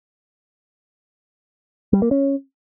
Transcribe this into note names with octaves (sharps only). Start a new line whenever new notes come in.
G3
A#3
C#4